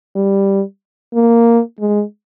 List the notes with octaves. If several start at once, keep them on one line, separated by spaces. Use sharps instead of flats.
G3
A#3
G#3